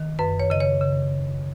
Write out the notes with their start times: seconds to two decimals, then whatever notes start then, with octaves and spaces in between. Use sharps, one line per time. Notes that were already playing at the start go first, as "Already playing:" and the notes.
Already playing: D#3
0.19 F#2 B4
0.40 C#5
0.50 C#3 D#5
0.60 C#5
0.81 C#3